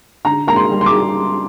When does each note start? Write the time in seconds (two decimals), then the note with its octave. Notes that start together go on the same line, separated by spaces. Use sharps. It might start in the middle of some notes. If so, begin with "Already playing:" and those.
0.25 D3 A#5
0.47 A#3 A#5
0.56 C6
0.71 G3
0.81 C6
0.86 D6